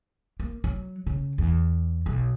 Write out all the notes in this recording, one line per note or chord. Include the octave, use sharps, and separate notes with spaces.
A#3
F#3
C#3
E2
B1